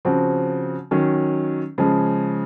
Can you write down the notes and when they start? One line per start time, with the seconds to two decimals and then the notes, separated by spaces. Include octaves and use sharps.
0.05 C#3 F3 C4 F#4
0.91 D#3 F#3 C#4
1.78 C#3 F3 G#3